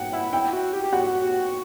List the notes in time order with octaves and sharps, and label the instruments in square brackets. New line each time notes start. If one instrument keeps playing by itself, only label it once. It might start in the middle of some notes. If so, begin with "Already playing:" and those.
Already playing: [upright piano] F#5 G5
[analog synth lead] E4
[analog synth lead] E4 [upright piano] G5
[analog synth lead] F#4
G4
G4
[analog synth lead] F#4 [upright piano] F#5
[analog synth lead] F#4